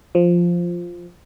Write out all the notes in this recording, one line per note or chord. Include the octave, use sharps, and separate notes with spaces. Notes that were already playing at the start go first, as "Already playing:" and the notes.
F3